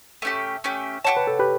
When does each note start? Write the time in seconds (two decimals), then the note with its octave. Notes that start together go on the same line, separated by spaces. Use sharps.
0.22 A3 C#4 G4
0.64 A3 C#4 G4
1.04 G4 C#5 D5 F#5 A5
1.17 B4
1.27 A4
1.39 G4 B4